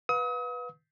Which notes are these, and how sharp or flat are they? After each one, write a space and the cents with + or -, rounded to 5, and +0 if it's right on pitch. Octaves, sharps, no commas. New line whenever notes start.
B4 -10 F5 +35 D#6 +40